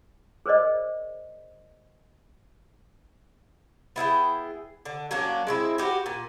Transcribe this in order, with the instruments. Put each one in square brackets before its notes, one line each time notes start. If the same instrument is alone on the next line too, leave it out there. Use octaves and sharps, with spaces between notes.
[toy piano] G#4 A#4 C5 D5 D#5
[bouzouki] B3 E4 G#4 G5
D3
F#3 A#3 C#4 D4
G#3 C4 E4
F#4 G4 B4
A#2